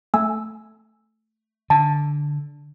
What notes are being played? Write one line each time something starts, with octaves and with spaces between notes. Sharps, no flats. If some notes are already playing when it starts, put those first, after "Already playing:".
A3 G#5 E6
D3 A5